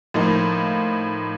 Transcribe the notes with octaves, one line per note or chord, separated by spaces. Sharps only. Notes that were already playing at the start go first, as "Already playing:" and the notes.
A2 F3 A#3 D#4